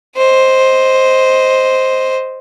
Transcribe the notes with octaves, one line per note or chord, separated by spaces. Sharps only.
C5 D#5